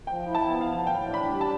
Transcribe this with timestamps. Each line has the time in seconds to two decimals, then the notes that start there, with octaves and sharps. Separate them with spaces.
0.07 F3 G5
0.27 E4
0.35 A5
0.48 B3
0.61 F5
0.67 F3
0.87 A2 G5
1.08 D4
1.14 B5
1.28 G3
1.41 A5